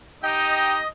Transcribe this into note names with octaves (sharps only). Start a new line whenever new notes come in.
D#4 G4 D#5 G5